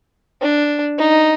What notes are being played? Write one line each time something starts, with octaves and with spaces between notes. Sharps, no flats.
D4
D#4